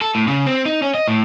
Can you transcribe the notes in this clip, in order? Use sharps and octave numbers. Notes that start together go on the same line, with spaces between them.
A4
A2
C#3
C4
D#4
C#4
D#5
A2